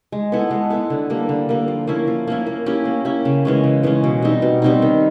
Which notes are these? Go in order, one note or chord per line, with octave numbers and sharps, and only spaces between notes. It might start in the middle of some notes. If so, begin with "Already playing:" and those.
G#3
B3 E4 A4
G#3
B3 E4 A4
D3
G3 A#3
D3
G3 A#3
F3
A#3 C#4 E4
F3
A#3 C#4 E4
A#3
C#4 E4 G4
A#3
C#4 E4 G4
C#3
E3 G#3 C#4
C#3
E3 G#3 C#4
B2
G3 C4 D#4
B2
G3 C4 D#4
D#3